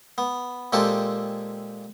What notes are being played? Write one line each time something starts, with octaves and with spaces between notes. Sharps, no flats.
B3
A#2 G#3 C4 G4 A4